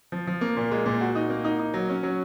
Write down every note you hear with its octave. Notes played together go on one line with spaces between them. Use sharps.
F3
F3
A#3
A#2
G#3
A#2
F#4
D#4
A#3
D#4
D#4
F#3
C#4
F#3